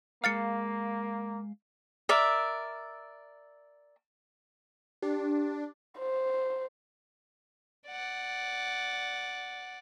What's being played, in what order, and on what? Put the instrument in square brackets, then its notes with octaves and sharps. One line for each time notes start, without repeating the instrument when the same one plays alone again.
[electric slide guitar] G#3 F5 [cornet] A#3 [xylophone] F6 A6 C#7
[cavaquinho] A#4 D5 E5
[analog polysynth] D4 [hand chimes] G4
[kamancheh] C5
[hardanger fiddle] D5 F#5